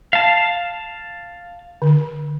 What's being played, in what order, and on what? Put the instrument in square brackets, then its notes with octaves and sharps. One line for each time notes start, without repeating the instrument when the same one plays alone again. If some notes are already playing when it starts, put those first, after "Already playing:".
[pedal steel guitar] F5 A5
[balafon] D3